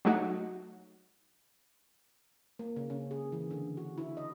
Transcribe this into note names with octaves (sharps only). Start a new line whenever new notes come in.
F#3 A3 D#4 F#4
A#3
C#3
C#4
G#4
E3
D3
F#4
E4
D#5